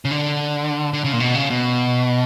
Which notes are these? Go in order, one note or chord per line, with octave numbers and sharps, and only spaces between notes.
C#3
D3
D3
C#3
A#2
B2
C#3
B2